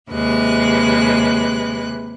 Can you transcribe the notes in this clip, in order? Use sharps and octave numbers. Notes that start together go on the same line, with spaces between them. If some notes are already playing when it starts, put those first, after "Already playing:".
D#2 C3 G#3 B4 F#6